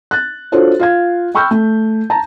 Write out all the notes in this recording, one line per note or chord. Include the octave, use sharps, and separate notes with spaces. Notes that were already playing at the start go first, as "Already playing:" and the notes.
F#6 A6
D4 F4 F#4 A4 C5 C#5
F4 F5 G#6
G5 B5 C#6 E6 F6 G6
A3
A5 A#5